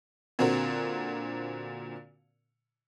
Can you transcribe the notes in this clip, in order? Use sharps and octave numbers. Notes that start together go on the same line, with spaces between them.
A#2 D3 C4 F#4 A#4